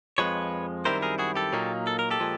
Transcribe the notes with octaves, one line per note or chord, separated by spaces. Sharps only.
F2 C#3 F3 G#3 B4 C#5
F#2 D#3 G3 C4 E4 A#4 C5
G#4 A#4
F#4 G#4
G4 A4
A#2 F#3 A#3 D#4
A4
A#4
G4 A4
A#2 F3 G#3